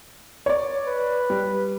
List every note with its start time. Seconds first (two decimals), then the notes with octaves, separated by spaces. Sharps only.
0.46 C#5 D5
0.86 B4
1.30 G3